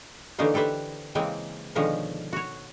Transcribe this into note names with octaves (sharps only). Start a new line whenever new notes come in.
D3 E3 A#3 C#4 D#4 C5
G4 A4 B4 C5 E5
C#3 E3 G#3 A#3 C4 G5
B2 D3 D#3 F3 G#3 C#4
F#4 C#5